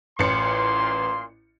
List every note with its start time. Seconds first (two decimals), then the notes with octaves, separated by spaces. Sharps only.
0.19 A1 A#2 C6 C#7